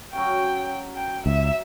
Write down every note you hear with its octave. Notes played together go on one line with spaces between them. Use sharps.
F#3 C#4 F#4 G5
G5
C#2 E5